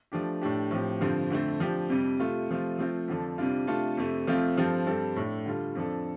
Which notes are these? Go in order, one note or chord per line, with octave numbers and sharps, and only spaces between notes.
F3 A3 D4 G4
A2 A3 D4 G4
A2 F3 C4 G4
G2 D3 F3 C4
F2 D3 A3 C4
F3 D4 G4
F2 C3 G3
C3 A3 F4
C3 F3 A3 F4
F3 A3 C4 F4
F2 D3 F3 D4 A4
F2 C3 G3 D4 F4
C3 A3 D4 F4 A4
F2 C3 A3
F2 F3 A3 C4 F4
G2 F3 C4 F4 A4
G2 G3 C4 A4
A2 A3 D4 A4
D3 G3 F4 A4
F2 F3 D4 A4